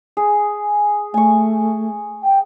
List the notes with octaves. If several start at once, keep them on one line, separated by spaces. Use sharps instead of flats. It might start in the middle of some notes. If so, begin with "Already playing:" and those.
G#4
A3 G#5 C#6
G5